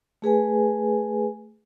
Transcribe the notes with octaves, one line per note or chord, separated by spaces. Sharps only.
A3 G#4 B4 G#5